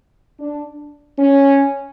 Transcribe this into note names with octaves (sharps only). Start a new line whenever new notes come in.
D4
C#4